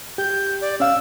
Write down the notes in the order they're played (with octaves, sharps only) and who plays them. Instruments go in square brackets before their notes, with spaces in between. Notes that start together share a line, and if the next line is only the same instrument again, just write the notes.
[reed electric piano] G4 [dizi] G6
[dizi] D5
[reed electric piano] C#4 F5 [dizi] E6